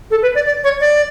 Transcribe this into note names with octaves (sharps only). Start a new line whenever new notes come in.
A4
B4
D5
D5
C#5
D5